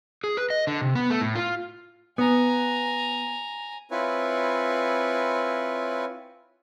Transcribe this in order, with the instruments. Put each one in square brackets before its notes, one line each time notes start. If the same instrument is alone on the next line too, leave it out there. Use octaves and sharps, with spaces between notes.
[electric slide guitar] G#4
B4
D#5
D3
C3
B3
A3
A2
F4
[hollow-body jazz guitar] B3 [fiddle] G#5 A#5
[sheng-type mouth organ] C4 E4 F4 B4 C#5 G#5